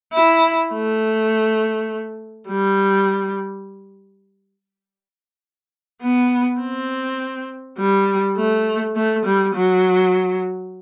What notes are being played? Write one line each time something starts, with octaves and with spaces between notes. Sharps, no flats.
E4
A3
G3
B3
C4
G3
A3
A3
G3
F#3